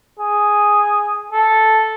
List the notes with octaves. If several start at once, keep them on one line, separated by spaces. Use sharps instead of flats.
G#4
A4